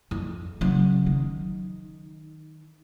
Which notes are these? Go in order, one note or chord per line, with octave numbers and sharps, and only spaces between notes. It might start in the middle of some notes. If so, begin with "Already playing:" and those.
F2
C#3 F#3
D#3